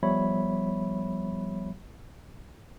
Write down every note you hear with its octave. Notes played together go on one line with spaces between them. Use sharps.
F3 G3 B3 C#5 E5 B5